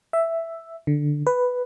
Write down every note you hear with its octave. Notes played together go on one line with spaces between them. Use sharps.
E5
D3
B4